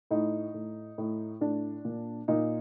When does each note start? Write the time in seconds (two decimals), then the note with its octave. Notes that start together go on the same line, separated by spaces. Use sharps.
0.11 A2 D#4
0.54 A2
0.98 A2
1.41 A2 D4
1.85 A#2
2.28 A#2 D#4